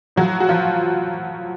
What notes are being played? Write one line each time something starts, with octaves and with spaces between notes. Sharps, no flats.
A2 F3 F#3 F#4
F#4
F3 F4